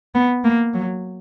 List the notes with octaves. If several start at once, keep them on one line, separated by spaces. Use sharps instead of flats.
B3
A#3
F#3